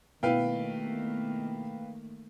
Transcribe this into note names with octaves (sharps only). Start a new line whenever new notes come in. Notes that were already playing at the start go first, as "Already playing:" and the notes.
B2 D#3 A3 A#3 E4 B4 F5 G5